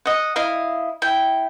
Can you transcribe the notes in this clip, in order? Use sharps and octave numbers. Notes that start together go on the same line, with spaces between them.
D#5 F#5
E4 D#5 F5
E4 G5